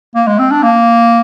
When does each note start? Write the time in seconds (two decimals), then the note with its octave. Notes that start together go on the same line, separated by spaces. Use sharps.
0.15 A#3
0.27 G#3
0.39 C4
0.51 D4
0.63 A#3